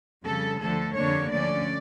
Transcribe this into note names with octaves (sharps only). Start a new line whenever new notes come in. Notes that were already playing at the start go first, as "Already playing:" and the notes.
F2 C#3 G3 A4
D2 D3 F3 A3 A4
F2 D3 G3 A#3 D4 C#5
D2 D3 F3 C#4 D5